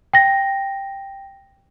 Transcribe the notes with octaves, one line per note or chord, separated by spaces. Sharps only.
G5 A#6